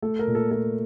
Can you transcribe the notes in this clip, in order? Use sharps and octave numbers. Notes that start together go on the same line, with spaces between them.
A3 A4
A#4
A#2
A4
A3 A4